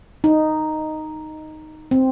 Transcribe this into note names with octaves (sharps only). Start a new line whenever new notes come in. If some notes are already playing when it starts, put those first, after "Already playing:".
D#4
C4